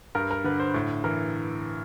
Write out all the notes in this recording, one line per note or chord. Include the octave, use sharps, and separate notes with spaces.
G2 A#4
A#4
D3 B4
C5
A2
E3 A#4